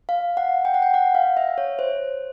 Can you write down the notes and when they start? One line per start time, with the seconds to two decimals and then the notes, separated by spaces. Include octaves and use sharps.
0.09 F5
0.37 F#5
0.65 G5
0.74 F#5
0.82 G5
0.94 F#5
1.15 F5
1.37 E5
1.58 C#5
1.79 C5